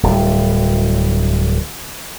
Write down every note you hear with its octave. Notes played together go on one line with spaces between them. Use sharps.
D1 G3